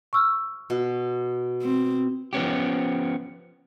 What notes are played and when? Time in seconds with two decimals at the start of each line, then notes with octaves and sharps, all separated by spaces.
0.13 C#6 E6 F6
0.70 B2
1.62 C4
2.33 F3 B3 C#4 G4